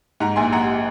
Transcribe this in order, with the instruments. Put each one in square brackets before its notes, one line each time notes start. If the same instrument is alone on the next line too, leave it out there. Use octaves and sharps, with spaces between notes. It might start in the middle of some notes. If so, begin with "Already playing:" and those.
[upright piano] G#2 F#5 A#5
A#1 G#5 C6
A#1 F#5 A#5